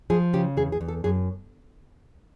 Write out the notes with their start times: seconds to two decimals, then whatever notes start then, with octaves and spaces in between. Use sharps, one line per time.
0.10 F3 G#4
0.33 C#3 G4
0.57 E2 G#4
0.72 G#4
0.81 E2
0.88 A4
1.04 F#2 G#4